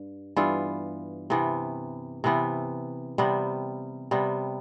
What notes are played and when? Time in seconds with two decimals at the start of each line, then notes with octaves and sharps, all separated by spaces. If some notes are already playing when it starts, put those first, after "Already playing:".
Already playing: G2
0.36 G2 E3 B3 F4
1.30 C3 E3 B3
2.24 C3 E3 B3
3.18 C3 G3 B3
4.11 C3 G3 B3